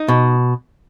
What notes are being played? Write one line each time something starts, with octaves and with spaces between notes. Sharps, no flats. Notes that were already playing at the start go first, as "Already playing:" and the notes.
Already playing: D#4
B2